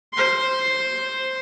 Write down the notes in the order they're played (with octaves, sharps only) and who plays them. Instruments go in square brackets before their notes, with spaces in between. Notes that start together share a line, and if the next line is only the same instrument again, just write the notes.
[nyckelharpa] C5 C6